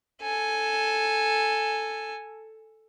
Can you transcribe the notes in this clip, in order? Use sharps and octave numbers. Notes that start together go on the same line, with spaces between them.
A4 G#5